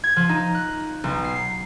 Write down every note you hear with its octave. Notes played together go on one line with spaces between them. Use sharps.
G#6
F3
D#4
F#6
B1
C7